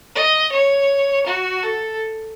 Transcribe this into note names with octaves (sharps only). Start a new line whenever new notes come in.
D#5
C#5
F#4
A4